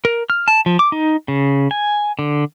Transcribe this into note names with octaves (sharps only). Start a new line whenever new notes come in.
A#4
F6
A5
F3
D6
D#4
C#3
G#5
D3